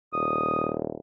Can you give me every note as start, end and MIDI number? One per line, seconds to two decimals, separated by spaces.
0.13 1.00 27
0.13 0.72 87